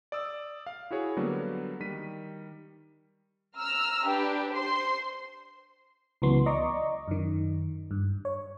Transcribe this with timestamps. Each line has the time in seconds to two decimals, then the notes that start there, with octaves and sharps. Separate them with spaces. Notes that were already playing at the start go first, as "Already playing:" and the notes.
0.12 D5 D#6 E6
0.66 F5
0.91 E4 F#4 G#4 C#5
1.17 D3 F#3 G3 A#3 B3
1.80 D#3 G3 B6 D#7
3.58 A#5 E6 F6
4.07 D4 G4 B4
4.50 C5 C6
6.22 C#2 E3 F#3 B3 C6
6.46 D5 D#5 A#5 C#6 D6
7.08 F#2 D#3
7.91 G2
8.25 C#5